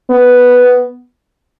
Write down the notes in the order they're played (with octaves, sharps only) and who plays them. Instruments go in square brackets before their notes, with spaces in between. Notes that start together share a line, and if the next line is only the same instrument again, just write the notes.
[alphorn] B3